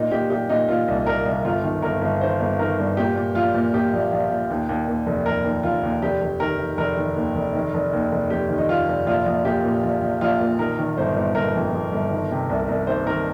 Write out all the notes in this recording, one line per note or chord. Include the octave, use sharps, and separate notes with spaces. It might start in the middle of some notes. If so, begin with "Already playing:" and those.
Already playing: A#2 D#4
A#2 G4
A#2 G4
A#2 D#4
A#2 F4
C2
C2 A#4
C2
G1 F4
D#3
G1 A#4
G1
D#3 C5
G1
D#3 A#4
G2
A#2 G4
A#2
A#1 F4
A#2
A#2 G4
A#1
A#1
A#2
D#2
D#2
D#2
F1
F1 A#4
D#2
F1 F4
D#2
F1 G4
F1
D#3 A#4
D#3
F1 A#4
D#3
D#2
F1
D#3
F1
D#2
F1
F1 G4
D#3
D#4
F1 F4
F1
A#1 F4
A#1
A#2 G4
A#2
A#1
A#1
A#1 F4
A#2
D#3 A#4
D#3
G1 C5
G1
G1 A#4
F2
F2
G1
D#3
C3
C2
C2
D#3 C5
D#3 A#4